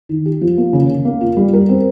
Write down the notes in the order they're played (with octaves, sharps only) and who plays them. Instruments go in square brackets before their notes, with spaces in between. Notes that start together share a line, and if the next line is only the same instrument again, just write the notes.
[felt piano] D#3
G4
F3
A#3
C#3
C#3
A#3
F4
G3
A#4
C4